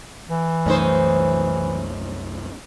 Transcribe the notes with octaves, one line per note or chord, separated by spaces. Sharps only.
E3
C2 F#2 A3 C#4 D#4 C5